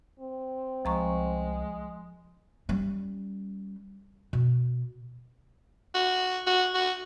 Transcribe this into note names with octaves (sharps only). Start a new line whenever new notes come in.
C4
C2 F3 G#3 A#5 C#6
G3 C#4
B2
F#4
F#4
F#4